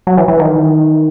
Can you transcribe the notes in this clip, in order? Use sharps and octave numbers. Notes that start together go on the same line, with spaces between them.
F#3
E3
E3
D#3